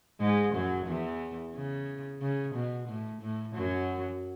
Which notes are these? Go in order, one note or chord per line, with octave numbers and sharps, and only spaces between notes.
G#2 G#3
F#2 F#3
E2 E3
C#3
C#3
B2
A2
A2
F#2 F#3